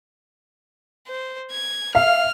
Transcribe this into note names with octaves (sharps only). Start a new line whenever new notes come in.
C5
G#6
E5 F5 F6